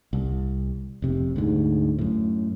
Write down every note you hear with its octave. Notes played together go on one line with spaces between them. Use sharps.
C2
F1 C3
D2 G#2
F#2 A2